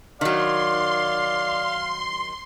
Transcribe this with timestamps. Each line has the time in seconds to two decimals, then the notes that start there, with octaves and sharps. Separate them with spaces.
0.21 D#3 F#3 D5 F5 C6